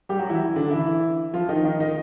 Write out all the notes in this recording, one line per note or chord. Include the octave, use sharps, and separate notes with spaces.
G3 G4
F#3 F#4
E3 E4
D3 D4
E3 E4
F3 F4
D#3 D#4
D#3 D#4
D#3 D#4